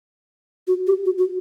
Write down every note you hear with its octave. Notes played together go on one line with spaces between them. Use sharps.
F#4
G4
F#4
F#4